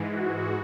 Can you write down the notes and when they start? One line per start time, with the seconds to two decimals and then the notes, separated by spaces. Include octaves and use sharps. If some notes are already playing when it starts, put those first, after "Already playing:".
Already playing: G#2 E3 G#3
0.16 F#4